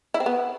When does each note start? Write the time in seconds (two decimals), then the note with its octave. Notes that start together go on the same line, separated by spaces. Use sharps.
0.14 E4
0.20 C4
0.26 B3